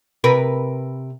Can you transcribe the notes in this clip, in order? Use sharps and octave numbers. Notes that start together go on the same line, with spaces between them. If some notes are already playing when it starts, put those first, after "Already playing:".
C3 A#4 B4